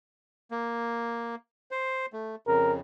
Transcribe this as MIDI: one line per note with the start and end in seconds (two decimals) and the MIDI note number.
0.51 1.35 58
1.71 2.06 72
2.13 2.35 57
2.47 2.80 41
2.47 2.80 49
2.47 2.73 70